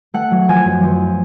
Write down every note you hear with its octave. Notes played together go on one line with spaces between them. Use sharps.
A3 F#5
F#3
F3 G#5
F#2
F3